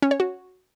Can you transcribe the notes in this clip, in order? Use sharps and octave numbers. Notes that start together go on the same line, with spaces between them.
C#4
C#5
F#4